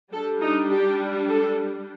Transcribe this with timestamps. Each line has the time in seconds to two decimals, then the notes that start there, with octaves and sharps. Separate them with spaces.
0.12 G3 D4 A4
0.41 D#4
0.70 G4
1.28 A4